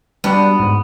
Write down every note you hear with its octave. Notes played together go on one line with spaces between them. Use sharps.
G3 B3 D4 F#4
G#2